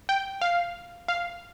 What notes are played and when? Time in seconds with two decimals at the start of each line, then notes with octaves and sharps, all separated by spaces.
0.09 G5
0.41 F5
1.08 F5